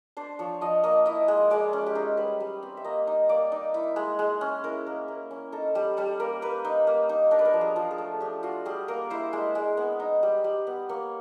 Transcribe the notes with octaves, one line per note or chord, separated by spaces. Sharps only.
D4 C5
F3 C#5
F3 D#5
A#3 D#5
E4 D#5
G#3
G#3 D5
C#4
G4
D#4 G#4
G3 B4
G3
C4
E5
A#3 D#5
D#4
A#3 D5
D#4
E4
G#3
G#3
C#4
E4 A#4
A#3
A#3
C#4
D#4 A4
G3 A4
G3 A4
A#3 A#4
A#3 B4
D#4
A#3
D#4
D4 A#4
B4
A#4
F3
G#4
F3
G#4
A3
D4 G4
F4 F#4
G3 G#4
A#3 A#4
E4 C5
G#3
G#3
B3
D#4
G3
G3
B3
A#3 C#5